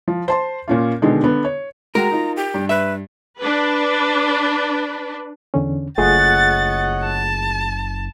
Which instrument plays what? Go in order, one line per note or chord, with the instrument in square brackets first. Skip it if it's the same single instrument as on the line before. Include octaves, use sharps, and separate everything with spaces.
[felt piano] F3
C5 A5 C6
A#2 C#4 F4
B2 D3 D#3 G#3
D3 B3
C#5
[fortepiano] G#3 F#4 G5 [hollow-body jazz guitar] A#4 [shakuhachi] A#5
[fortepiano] D#4 F4
[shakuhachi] G4
[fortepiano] G2
[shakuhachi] B4 [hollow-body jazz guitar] E5
[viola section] D4 B4
[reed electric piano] E2 D3 C#4
[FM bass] F#1 [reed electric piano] A3 F4 G#4 [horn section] C#5 D#5 F#5 [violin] A6
[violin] A5